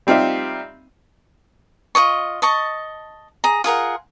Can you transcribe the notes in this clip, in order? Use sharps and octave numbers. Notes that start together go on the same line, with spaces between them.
G3 C4 D#4 F4 G4 E5
F4 A#4 D#5 C#6
D#5 A5 C#6
G#4 A#5
F4 G#4 A#4 F#5